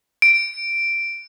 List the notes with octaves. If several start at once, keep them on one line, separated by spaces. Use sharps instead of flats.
D7